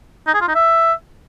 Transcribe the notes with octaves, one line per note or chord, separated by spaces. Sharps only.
D#4
G#4
F4
D#4
E5